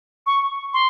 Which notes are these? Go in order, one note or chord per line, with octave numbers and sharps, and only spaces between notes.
C#6
C6